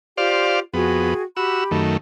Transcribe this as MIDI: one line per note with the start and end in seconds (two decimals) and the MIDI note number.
0.18 0.60 65
0.18 0.60 67
0.18 0.60 72
0.18 0.60 74
0.18 0.60 77
0.74 1.14 41
0.74 1.14 59
0.74 1.23 66
0.74 1.23 68
0.74 1.23 79
1.37 1.64 66
1.37 1.80 67
1.37 1.80 83
1.37 1.64 88
1.71 1.97 42
1.71 1.97 51
1.71 1.97 57